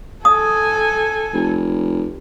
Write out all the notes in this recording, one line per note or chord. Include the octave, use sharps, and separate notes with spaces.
A4 G#5 D#6
F1